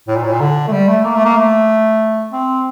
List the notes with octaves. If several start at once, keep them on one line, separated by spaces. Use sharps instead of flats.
A2
A#2
A2
A#2
D3
A3
G3
A3
A#3
A3
A#3
A3
C4